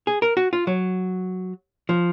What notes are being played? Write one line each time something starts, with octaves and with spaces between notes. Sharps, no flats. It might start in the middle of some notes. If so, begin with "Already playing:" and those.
G#4
A#4
F#4
F4
F#3
F3